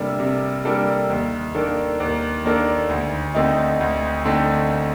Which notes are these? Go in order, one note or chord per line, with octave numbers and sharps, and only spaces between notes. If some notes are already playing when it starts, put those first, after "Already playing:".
Already playing: C3 G3 A#3 D4 A4
C3
G3 A#3 D4 A4
D#2
D#3 A#3 D4 A4
D#2
D#3 A#3 D4 A4
D2
D3 A3 C4 D#4
D2
D3 A3 C4 D#4